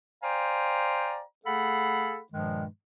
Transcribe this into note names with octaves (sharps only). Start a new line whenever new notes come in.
C5 D5 F5 G5 G#5 A#5
A3 G#4 A4 F5 F#5 B5
G2 A#2 D#3 F3 G#3